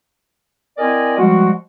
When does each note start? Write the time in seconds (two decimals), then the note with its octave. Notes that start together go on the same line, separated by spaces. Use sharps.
0.78 C4 E4 A#4 D5 D#5 G#5
1.18 F3 G3 G#3 F#4